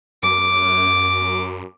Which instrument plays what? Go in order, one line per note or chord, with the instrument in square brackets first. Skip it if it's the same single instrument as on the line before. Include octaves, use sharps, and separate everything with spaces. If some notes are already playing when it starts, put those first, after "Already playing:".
[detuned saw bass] F#2 [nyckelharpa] D6